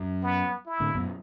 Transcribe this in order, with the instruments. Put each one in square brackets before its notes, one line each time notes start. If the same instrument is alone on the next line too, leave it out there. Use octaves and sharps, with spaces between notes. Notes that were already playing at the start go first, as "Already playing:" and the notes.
Already playing: [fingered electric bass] F#2
[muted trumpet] B3
E4
[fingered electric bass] A2 D3
F#2 B2